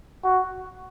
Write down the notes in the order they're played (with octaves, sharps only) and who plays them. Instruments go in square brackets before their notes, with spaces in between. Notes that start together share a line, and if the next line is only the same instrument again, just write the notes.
[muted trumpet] F#4